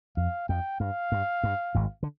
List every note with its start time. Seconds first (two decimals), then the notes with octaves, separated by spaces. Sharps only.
0.17 F2 F5
0.49 F2 G5
0.80 G2 F5
1.12 G2
1.44 G2
1.75 G#1 G#2
2.03 D3